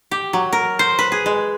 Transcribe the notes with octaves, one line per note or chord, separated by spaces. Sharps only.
G4
F#3
A#4
C5
B4
G#4
G#3